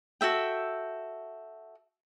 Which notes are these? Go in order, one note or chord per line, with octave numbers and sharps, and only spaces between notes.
F#4 A4 E5 G5